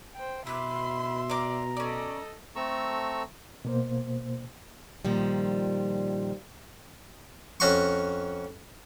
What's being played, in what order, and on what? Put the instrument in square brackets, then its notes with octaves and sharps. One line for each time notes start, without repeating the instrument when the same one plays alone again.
[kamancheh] C5 G5
[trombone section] B2 [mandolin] E4 D6 [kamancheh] E5 C6 [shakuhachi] B5
[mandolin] D5 D6 [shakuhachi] A#5
[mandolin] C#4 D5 [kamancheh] A4 D#5
[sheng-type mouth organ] A3 C4 A4 A#5 C#6 E6
[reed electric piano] B2 A#3 C5
[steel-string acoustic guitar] A#2 D#3 F3 G3
[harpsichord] F2 C#4 F#4 C6 C#6